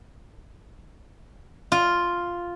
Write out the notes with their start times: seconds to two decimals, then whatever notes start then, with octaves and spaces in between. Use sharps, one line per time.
1.72 F4